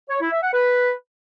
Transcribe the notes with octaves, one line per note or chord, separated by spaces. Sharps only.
C#5
E4
E5
F#5
B4